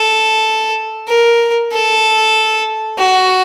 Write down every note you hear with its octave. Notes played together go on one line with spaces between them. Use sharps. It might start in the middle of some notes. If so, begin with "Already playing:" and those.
Already playing: A4
A#4
A4
F#4